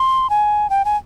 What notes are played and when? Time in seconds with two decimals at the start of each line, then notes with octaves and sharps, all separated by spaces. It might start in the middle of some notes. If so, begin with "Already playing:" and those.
Already playing: C6
0.30 G#5
0.70 G5
0.85 G#5